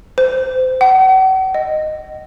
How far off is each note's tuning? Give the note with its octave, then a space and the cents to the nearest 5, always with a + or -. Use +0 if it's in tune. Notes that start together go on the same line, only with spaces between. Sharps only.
C5 -25
F#5 +40
D#5 -10